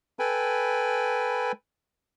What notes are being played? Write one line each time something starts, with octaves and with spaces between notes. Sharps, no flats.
A4 B4 G5 G#5 B5